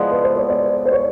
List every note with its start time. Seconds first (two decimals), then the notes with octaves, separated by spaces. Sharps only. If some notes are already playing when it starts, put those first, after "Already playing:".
Already playing: F3 G#3 B3 E4 D5
0.11 B4
0.24 C5
0.36 C#5
0.50 D5
0.85 C5
0.92 C#5